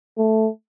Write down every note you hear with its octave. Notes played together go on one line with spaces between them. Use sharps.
A3